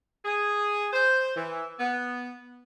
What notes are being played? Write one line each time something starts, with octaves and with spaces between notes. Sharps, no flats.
G#4
C5
E3
B3